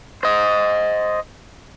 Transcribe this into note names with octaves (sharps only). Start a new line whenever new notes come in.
C5 D#5